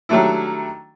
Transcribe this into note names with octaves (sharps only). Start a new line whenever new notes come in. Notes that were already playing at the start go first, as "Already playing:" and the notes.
D#3 F#3 G3 A3 D4 E4